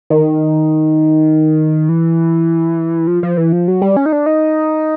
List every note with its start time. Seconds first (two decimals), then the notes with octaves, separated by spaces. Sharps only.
0.10 D#3
1.89 E3
3.07 F3
3.23 F3
3.37 E3
3.53 F3
3.68 F#3
3.82 G3
3.97 C#4
4.06 D#4
4.13 D4
4.26 D#4